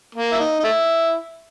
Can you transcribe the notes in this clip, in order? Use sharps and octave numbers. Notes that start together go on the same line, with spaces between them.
A#3
E4
D#4
D#4
A3 E4